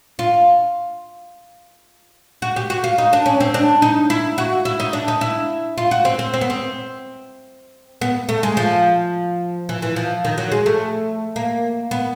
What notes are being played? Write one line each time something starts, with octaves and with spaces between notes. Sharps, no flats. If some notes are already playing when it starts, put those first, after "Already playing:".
F4
F#4
G4
F#4
F4
D#4
D4
C#4
C4
D4
D#4
E4
F#4
E4
D#4
D4
D#4
E4
F4
F#4
C4
C4
C4
B3
C4
B3
A3
G#3
F3
E3
E3
F3
D#3
F#3
G#3
A3
A#3
B3